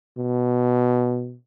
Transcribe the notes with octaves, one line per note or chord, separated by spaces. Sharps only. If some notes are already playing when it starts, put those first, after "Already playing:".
B2